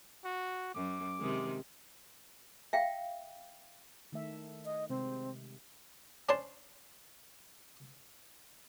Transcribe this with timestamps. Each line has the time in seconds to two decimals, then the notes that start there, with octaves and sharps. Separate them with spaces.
0.24 F#4
0.75 F#2 D6
1.19 C3 D#3 G#3
2.73 E5 F5 G5
4.12 D#3 A3 E5
4.65 D#5
4.90 C3 G#3 C4
6.29 C#4 D4 C5 C#5 A5 C6